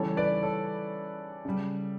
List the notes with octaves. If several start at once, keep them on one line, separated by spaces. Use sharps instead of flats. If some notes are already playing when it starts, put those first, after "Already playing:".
Already playing: C#3 E3 G3 A4 C#5
B4 D5
A4 C#5
C#3 G3